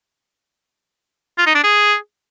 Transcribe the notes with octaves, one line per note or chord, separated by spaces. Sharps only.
F4
D#4
D4
G#4